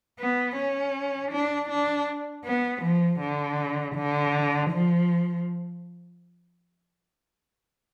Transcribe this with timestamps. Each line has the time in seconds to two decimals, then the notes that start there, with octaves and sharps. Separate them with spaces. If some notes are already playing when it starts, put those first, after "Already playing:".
0.19 B3
0.57 C#4
1.32 D4
1.70 D4
2.45 B3
2.82 F3
3.20 D3
3.95 D3
4.70 F3